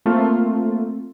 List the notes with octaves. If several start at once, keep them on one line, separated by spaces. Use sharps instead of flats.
A3 A#3 C4 F4